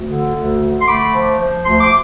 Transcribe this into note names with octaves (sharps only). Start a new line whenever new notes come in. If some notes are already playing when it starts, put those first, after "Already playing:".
Already playing: D2
D3
D2
D3
C6
A3 B5 D6
F3
F3
D2 C6
D6